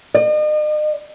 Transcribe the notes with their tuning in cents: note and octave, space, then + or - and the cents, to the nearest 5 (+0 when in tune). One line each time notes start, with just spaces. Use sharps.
D#5 -45